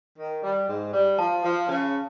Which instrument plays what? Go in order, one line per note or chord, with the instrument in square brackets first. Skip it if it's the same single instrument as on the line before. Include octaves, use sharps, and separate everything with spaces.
[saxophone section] D#3
G3
G#2
G3
[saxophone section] F3 [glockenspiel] A5
[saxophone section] F3
C#3